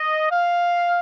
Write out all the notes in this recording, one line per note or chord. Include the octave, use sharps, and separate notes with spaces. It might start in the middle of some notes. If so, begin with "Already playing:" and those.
Already playing: D#5
F5